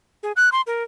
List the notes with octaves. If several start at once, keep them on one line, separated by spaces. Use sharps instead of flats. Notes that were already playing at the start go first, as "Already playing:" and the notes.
G#4
F#6
C6
A#4